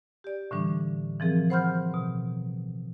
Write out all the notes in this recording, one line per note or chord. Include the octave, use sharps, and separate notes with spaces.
G4 D5
A2 D3 E3 G3 D4
E3 F3 C4 G#4 A#4
C5 F#5 B5 C6 F6 G6
B2